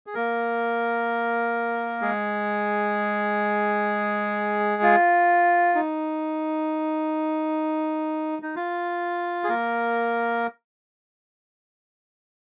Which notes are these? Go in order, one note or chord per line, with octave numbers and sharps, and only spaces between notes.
G#4
A#3 A#4
G#3 G#4
F4
D#4
D#4
F4
G#4
A#3 A#4